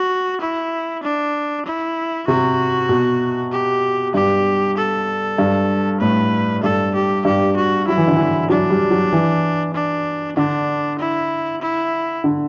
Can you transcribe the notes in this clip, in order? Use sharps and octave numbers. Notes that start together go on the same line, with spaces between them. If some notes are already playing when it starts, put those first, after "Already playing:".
Already playing: F#4
E4
D4
E4
C3 F#4
B2
G4
G2 G4
A4
G2
A2 B4
G2 A4
G4
G2 G4
F#4
F#3 E4
E3
D3
E3
F#3 D4
G3
F#3
E3
D4
D3 D4
E4
E4
D3